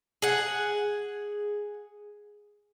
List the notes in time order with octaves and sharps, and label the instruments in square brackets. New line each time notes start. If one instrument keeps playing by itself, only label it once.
[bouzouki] G#4 F#5